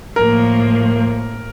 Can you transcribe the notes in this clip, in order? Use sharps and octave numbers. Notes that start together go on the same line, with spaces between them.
A2 F3 A#3 A#4